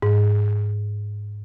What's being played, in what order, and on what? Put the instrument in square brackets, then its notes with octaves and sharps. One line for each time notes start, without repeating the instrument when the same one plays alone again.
[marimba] G#2